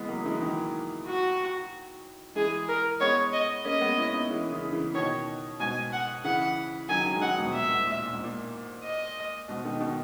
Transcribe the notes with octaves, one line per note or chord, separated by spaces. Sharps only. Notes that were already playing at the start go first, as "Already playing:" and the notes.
Already playing: C#3 E3 G#3 B3
F#3 A#3
E3 G#3
D#3 F#3
F#4
E3 G#3 G#4
A#4
G#3 B3 C#5
D#5
A#3 C#4 D#5
G#3 B3
C#4 E4
B3 D#4
E3 G#3
C#3 E3
C#3 E3
B2 D#3 C#5
G#2 B2 G#5
F#5
C#3 E3 F#5
D#3 F#3 G#5
D#3 F#3
G#3
D#3 F#3 F#5
G#2 B2
A#2 E5
G#2
A#2
A#2
G#2
A#2
D#5
G#2 B2
B2 D#3
B2 D#3